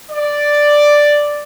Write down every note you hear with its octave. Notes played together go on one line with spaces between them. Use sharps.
D5